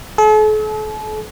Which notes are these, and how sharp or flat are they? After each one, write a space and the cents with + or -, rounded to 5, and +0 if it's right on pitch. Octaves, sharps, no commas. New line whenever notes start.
A4 -45